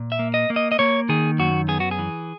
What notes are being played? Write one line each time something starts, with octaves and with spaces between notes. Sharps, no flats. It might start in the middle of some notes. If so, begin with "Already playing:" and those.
Already playing: A#2
E5
A#3
D#5
A#3
D#5
D#5
A#3 C#5
D#3 G#4
F#2 F#4
B3 G#4
F#4
G#4
E3